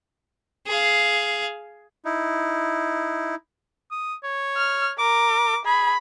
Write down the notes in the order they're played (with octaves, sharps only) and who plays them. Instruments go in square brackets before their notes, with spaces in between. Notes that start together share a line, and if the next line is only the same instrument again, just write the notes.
[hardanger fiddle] G#4 F5
[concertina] D#4 E4
[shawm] D#6
C#5
[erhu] F6
[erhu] A#4 [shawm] D6
[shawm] G#4 [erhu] B5